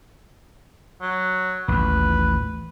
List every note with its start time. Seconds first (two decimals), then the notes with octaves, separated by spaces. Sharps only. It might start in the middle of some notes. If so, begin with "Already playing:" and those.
1.02 F#3
1.68 A1 D#2 B4